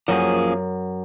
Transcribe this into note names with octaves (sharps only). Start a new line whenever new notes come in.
F#2 F3 A#3 C#4 G#4